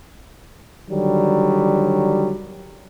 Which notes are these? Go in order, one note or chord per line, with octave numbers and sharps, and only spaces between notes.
D3 D#3 F#3 G3